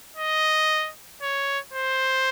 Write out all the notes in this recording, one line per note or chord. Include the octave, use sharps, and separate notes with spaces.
D#5
C#5
C5